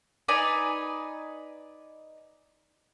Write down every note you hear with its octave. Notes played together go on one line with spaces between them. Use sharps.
D#4 B4 D5 G#5